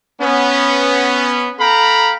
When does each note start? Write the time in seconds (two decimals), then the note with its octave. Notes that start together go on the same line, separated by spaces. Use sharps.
0.21 B3 C#4
1.60 A4 F5 G5 A#5 B5